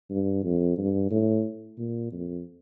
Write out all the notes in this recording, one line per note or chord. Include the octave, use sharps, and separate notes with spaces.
G2
F2
G2
A2
A#2
F2